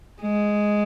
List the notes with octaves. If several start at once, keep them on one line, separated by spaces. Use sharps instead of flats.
G#3